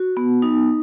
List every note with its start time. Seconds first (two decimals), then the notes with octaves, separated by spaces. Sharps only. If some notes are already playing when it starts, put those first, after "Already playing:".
Already playing: F#4
0.17 B3
0.42 D#4